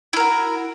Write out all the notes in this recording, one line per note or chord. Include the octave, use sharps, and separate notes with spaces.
E4 F#4 A#4